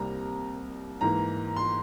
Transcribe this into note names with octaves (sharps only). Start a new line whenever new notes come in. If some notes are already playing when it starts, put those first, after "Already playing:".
Already playing: C2 C3 G3 A#3 A#5
G#2 E3 A#3 A#5
C6